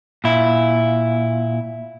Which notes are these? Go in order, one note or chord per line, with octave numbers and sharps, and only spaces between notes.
A#2 E4